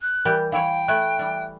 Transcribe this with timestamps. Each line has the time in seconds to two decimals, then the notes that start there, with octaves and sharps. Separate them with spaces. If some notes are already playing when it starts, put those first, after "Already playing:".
0.01 F#6
0.25 E3 G3 G4 A#4 G6
0.52 E3 E4 C#5 F5 G5
0.88 A3 E4 E5 G#5 F#6
1.19 E3 G3